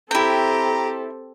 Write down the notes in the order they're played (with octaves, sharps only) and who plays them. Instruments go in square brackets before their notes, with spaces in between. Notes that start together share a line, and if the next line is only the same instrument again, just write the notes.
[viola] C4 A4 [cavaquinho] E4 G5 [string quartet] G4 [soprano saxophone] A#5